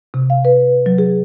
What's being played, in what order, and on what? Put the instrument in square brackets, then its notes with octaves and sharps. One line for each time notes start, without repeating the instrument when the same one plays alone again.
[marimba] C3
F5
B4
F#3
G#4